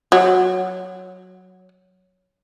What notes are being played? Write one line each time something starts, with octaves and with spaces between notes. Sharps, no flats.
F#3